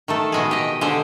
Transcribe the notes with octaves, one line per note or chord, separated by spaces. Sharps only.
D#3 A3 A4
B2 G#3 G#4
G4 D#5
D3 G#3 G4 C5